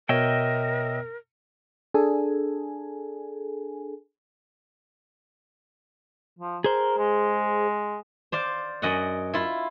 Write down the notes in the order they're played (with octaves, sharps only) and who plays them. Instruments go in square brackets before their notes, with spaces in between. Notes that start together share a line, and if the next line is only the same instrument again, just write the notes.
[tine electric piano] B2 B3 C#5 [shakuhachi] A#4 [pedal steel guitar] D#5 E5 G5
[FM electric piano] D4 G#4 A4 G#5
[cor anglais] F3
[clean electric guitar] G#4 C5 [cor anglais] A#4
[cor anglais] G#3
[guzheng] C5 D5 F5
F#2 D#5 F#5
E4 F4